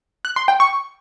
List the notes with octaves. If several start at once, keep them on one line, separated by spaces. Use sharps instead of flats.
F#6
C6
G5
C#6